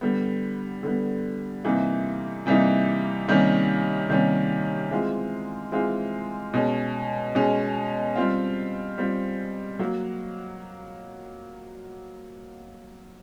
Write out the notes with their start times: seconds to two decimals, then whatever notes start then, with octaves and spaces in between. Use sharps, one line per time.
0.01 D3 G3 B3
0.83 D3 G3 B3
1.64 C3 E3 G3 A#3 D#4
2.46 C3 E3 G3 A#3 D#4
3.28 C3 D#3 G3 A#3 C#4
4.09 C3 D#3 G3 A#3 C#4
4.90 E3 G#3 C4 F4
5.72 E3 G#3 C4 F4
6.54 B2 G#3 C#4
7.35 B2 G#3 C#4
8.16 G3 C4 F4
8.98 G3 C4 F4
9.79 F#3 A#3 F#4